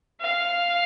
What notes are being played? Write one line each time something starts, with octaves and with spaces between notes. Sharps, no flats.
F5